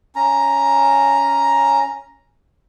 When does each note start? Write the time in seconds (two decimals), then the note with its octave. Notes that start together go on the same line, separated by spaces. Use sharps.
0.16 C#4 A#5